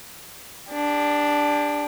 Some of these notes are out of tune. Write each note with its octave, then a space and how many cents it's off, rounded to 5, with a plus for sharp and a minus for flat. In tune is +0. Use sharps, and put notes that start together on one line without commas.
D4 +0 G4 +40